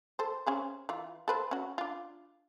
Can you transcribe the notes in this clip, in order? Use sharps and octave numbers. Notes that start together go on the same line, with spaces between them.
A4 C5
C#4 G#4 C5
E3 F4
A4 B4 C5
C#4 F#4
D4 F4